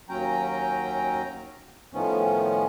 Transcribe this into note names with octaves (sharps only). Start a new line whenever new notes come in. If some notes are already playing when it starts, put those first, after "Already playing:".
D#2 F#3 C#4 G5 A#5
A2 D#3 F3 B3 C#4